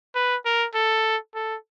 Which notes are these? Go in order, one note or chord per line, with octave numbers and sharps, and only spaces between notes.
B4
A#4
A4
A4